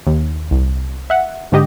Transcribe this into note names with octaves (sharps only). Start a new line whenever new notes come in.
D#2
C2
E5 F#5
G#2 D3 G4 D#5